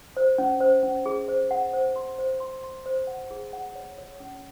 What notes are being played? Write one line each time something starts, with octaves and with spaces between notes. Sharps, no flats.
C5
C#4
C5
C#4
G#4
C5
F#5
C5
C6
C5
C6
C6
C5
F#5
G#4
F#5
C#5
C#5
C#4